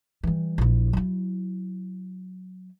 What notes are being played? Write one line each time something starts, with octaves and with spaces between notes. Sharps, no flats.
E3 G3
A#1 E4
F#3 E4